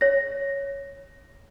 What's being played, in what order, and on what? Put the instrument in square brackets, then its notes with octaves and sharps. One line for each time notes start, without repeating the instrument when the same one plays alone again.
[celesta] C#5 A#6